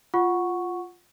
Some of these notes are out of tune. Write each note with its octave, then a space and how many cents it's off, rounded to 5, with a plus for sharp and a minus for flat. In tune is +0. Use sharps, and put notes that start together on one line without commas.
F4 +0 F#5 -5 C#6 +0